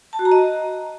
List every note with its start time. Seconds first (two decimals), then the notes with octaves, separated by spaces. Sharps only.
0.13 A5
0.19 F#4
0.25 A#5
0.32 D#5